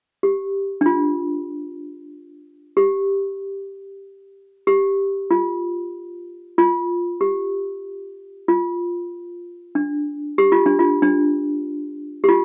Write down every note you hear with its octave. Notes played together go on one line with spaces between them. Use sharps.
G4
D4
F4
G4
G4
F4
F4
G4
F4
D4
G4
F4
D4
F4
D4
G4
F4